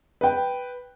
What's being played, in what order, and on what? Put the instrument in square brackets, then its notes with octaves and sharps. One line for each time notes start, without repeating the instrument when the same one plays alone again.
[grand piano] B4 G5